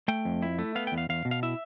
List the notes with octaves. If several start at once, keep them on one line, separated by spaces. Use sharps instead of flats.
A3 G5
F2
E4
A3
B3 F5
E2 G5
F5
E2 F5
B2
F5
E4 E5